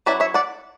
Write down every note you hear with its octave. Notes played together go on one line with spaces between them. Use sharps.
F#3 C#4 E4 B4 D5
C#5 E5
D5 F#5